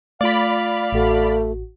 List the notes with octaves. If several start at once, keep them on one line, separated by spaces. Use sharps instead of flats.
A3 F4 D5 F5 B5
A1 A3 F#4